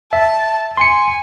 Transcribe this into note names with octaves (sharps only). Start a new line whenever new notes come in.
E5 A5
G#5 C6 C#7